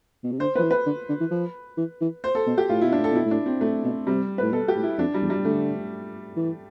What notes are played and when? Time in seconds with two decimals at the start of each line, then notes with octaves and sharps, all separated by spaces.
0.24 B2
0.32 C3
0.40 D3 C5
0.55 F3 B4
0.63 E3
0.71 B4
0.86 D3
1.09 D3
1.20 E3
1.31 F3
1.78 E3
2.01 E3
2.24 C5
2.35 A4
2.47 B2
2.58 G4
2.69 A2 F4
2.81 B2 E4
2.92 D4
2.98 A2
3.04 A4
3.12 B2 E4
3.26 A2
3.31 D4
3.46 C4
3.61 A2 A3
3.84 B2
4.07 C3 G3
4.38 A2 B4
4.52 B2 A4
4.68 G4
4.76 A2
4.83 E4
4.98 F2 D4
5.14 G3
5.22 E2
5.30 G3
5.45 D3 A3
6.37 E3